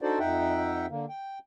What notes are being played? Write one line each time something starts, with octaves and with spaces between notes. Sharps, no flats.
D4 D#4 F#4 A4 C5 D5
F2 D#4 E5 F#5 G5
D3 A#3
G5